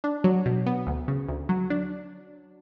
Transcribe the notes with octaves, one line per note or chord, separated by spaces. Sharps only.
D4
F#3
B2
B3
D2
C#3
D2
F#3
D4